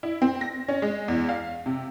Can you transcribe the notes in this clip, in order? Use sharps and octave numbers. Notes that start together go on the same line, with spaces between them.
E4
C4
A#6
C#4
G#3
E2
F5
C3